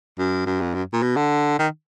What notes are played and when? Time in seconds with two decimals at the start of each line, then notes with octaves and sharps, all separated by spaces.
0.18 F#2
0.46 F#2
0.61 F2
0.74 F#2
0.93 A#2
1.02 B2
1.16 D3
1.59 D#3